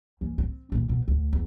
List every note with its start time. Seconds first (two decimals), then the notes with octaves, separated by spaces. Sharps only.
0.21 D#2 E3
0.38 C4
0.72 A#2 D#3
0.89 B2
1.08 D2
1.33 E2